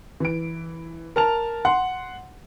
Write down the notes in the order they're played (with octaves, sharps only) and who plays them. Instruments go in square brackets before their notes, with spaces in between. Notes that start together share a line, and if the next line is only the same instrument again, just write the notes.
[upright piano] E3 D7
A#4 A5 F7
F#5 C6